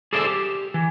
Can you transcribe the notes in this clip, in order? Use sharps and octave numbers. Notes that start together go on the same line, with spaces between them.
G#4 A4 C5 D5 E5
G4
E3